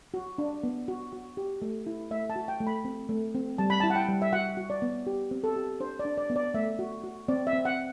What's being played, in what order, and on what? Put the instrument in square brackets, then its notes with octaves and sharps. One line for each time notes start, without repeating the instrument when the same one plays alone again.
[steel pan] F#4
D4
B3
F#4
F#4
G4
A3
E4
A3 E5
A5
F#4
G5
A3
B5
C4
A3
C4
G3 A5
B5
E4 A5
F#5
G5
G3
E5
F#4 F#5
F#4
D5
B3
G4
C4
A4
G4
D4 C5
D5
D4
D5
B3
D5
A3 E5
F#4
F#4
C4 D5
E5
C4
F#5